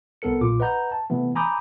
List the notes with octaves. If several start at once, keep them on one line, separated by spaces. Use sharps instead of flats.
C2 B3 A4 A#4 C#7
B1 A#2 F4 D6
B4 D#5 F#5 A#5 G6
A5
C3 E3 A3 B3
G#5 A#5 B5 D6 D#6 G6